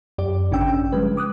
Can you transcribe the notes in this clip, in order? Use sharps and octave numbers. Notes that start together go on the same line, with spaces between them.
F#2 G4 D5
G#1 C#3 C#4 D4 G5 E6
F3 G3 G#3 B4
D6 D#6 F#6